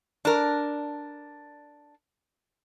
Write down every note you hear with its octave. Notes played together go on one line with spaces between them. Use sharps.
D4 A#4